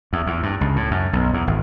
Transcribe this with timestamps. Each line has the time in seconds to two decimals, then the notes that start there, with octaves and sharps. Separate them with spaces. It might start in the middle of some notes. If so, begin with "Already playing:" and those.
0.13 E2
0.26 E2
0.43 G2
0.61 C#2
0.76 A2
0.91 F#2
1.13 B1
1.33 E2
1.47 G#1